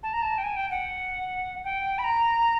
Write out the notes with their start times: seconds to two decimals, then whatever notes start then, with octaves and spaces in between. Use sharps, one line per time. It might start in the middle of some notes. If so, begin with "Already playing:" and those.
0.02 A5
0.13 A#5
0.21 A5
0.37 G5
0.43 G#5
0.56 G5
0.70 F#5
1.64 G5
1.98 B5
2.03 A#5